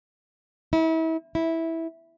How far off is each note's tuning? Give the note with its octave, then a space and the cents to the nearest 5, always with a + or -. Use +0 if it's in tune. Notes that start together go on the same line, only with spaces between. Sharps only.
E4 -35
E4 -10